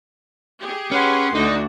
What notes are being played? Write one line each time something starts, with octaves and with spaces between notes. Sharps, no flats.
G4 G#4
C#4 B4 F#5 C6
D2 D3 D4 D#4 F#4